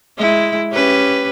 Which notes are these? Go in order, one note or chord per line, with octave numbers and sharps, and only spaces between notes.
G#3 E4
C#4 G4 B4